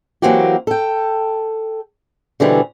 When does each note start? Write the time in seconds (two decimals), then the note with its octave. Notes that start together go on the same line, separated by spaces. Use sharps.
0.22 E3 F#3 A#3 C4 F#4 G4
0.67 A4 G5
2.40 B2 D3 E3 G3 C4